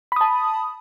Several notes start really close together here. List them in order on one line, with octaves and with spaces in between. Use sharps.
B5 D#6 A5